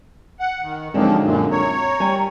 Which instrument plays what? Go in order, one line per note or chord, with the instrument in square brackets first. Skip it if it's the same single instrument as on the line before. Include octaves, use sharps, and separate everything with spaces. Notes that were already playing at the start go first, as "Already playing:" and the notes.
[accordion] F#5
D#3
[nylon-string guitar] D3 G#3 C4 [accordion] F3 F#3 A#3 [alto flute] D#4
[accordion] F#2 A#2
[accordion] C#5 [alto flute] A#5
[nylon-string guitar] G3 G#5